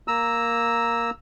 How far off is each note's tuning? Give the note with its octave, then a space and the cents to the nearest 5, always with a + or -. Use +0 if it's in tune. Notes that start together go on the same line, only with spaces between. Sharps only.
A#3 +0 A#5 +0 E6 -10